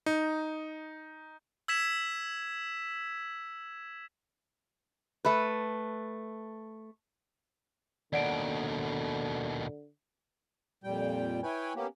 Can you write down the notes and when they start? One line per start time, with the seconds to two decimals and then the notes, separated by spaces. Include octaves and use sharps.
0.06 D#4
1.68 E6 G#6 B6 E7
5.25 A3 B4
8.13 D#2 B2 D3 D5 F#5 D7
10.84 F2 A#2 G3 G5
11.43 E4 B4 C#5 G5 G#5
11.76 A#3 B3 C#4 G4